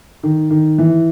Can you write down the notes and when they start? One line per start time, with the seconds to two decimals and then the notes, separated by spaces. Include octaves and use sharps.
0.23 D#3
0.50 D#3
0.78 E3